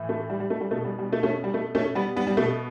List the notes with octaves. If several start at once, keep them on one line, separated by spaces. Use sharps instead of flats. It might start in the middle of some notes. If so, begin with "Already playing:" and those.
Already playing: A2 E3
A3
G3
G3
A3
G3
B2 A3
G3
G3
A3
A3 C#4
G3
A3
A3 C#4
G3 B3
G3 B3
G3
B2 A3